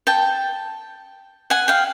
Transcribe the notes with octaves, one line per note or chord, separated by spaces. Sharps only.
G5 A5
F#5 G#5
F5 G5